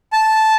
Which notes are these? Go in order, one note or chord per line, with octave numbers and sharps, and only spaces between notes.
A5